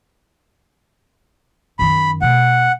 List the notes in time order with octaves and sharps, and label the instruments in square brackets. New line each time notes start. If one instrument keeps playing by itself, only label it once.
[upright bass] F#2 D#3 [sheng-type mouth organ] B5
[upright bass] B2 A3 [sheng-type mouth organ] F#5